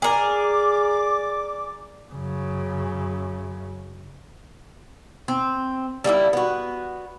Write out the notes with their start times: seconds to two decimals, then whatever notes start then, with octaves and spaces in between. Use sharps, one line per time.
0.02 G#4 A#4 D5 D6
2.12 F#2 C#3
5.28 C4
6.04 G3 A#3 D#4 E4
6.33 B3 F#4